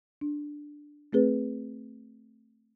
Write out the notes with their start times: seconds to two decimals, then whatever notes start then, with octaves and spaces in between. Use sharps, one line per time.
0.21 D4
1.13 A3 C4 G#4 B4